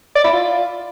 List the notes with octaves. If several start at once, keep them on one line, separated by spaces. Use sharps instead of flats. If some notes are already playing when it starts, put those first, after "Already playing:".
D5
E4
F4